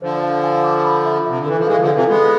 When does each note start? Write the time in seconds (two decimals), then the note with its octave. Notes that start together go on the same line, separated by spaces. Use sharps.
0.02 D3 F3 C5
0.23 F5
0.43 G#5
0.64 D6
0.84 B5
1.06 E5
1.26 C3 E5
1.39 D3
1.46 E3 A4
1.58 F3
1.67 E3 G#3 F5
1.80 D3 F3
1.87 A4
1.95 C3 E3
2.08 G#3 B3 A4